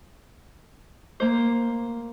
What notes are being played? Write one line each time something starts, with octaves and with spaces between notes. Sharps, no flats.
A#3 C5